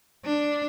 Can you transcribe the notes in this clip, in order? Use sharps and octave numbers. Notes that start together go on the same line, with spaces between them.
D4